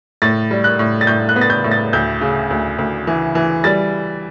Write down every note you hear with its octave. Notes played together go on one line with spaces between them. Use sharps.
A2 A6
G3
F#6
A2
A6
A2 G6
F#6
B3
A6
G6
A2
A6
D2 G6
C#3
D2
D2
E3
E3
G3 A6